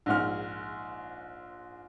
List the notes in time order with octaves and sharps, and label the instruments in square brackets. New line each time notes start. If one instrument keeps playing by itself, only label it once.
[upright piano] A#1 G#2 F#5 F6